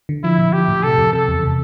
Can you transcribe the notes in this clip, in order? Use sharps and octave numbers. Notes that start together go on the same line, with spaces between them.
D3
F3 E4
A#2
F3 G4
A2
C3 A4
F2
C3 A4
E2
C3